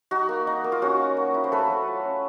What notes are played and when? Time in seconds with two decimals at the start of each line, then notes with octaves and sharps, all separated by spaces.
0.11 D#4 F#4
0.29 A#3
0.47 D#4
0.64 A#3
0.72 F4
0.82 C#4 F#4
0.99 A#3
1.17 A#3
1.34 E4
1.44 C5
1.52 A3 A4 B4
1.70 F#3
1.87 F4
2.05 C#4